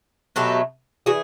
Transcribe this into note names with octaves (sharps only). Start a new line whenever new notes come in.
B2 F#3 A3 G4 A4
E3 F#4 G#4